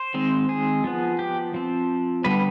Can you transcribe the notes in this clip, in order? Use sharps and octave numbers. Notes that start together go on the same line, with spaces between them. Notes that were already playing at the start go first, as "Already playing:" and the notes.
Already playing: C5
D#3 G#3 C4
G#4
F3 B3
G4
F3 C4
D3 G3 B3 B4